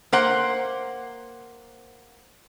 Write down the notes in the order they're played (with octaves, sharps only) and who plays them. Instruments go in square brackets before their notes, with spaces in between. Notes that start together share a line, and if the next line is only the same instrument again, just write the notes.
[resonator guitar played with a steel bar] A#3 C5 F#5